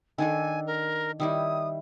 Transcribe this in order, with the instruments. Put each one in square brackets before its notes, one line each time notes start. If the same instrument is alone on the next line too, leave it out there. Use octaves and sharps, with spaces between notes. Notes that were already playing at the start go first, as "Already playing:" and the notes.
[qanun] D#3 D4 A4 [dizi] G#5
[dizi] A#4
[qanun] D#3 G3 E4 [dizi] D#6